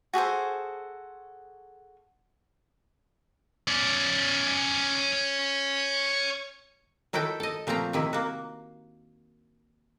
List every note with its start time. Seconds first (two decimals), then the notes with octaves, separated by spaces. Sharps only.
0.13 F#4 G#4 A4 C5
3.68 C#4 D5
7.13 D#3 E4 F#4 A4 G5
7.40 A4 D#5
7.67 A#2 F3 A3 C4 A#5
7.93 C3 D#3 E4
8.13 A#3 F#4